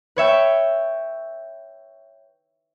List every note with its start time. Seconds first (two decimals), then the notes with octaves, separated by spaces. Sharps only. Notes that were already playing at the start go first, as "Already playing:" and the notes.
0.16 B4 C#5 E5 G5